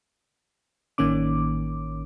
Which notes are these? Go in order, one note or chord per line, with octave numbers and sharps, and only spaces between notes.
A1 D#3 A#3 C#4 D6